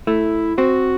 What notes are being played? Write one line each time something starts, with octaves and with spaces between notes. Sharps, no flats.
A3 E4
C4 F#4